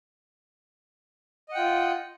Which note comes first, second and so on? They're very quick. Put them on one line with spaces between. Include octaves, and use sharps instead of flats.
D#5 F#5 G5 F4